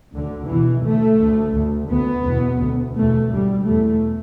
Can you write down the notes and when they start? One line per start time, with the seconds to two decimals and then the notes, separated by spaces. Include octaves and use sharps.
0.13 D2 D3
0.48 E2 B2 E3
0.84 D2 A3
1.19 D2
1.55 D2
1.90 D2 B3
2.25 E2 B2
2.60 D2
2.96 E2 B2 A3
3.31 D2 G3
3.67 E2 B2 A3